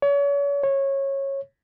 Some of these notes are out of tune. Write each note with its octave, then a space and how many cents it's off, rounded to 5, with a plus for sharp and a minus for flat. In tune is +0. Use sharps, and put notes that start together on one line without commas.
C#5 +35
C#5 -20